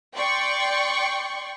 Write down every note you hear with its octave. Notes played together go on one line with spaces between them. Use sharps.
D5 G5 C6 C#6